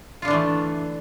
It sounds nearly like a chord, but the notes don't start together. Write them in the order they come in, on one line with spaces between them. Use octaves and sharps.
F4 D3 D4 E3 A3